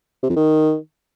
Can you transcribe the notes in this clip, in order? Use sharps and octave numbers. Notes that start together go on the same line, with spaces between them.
C3
F2
D#3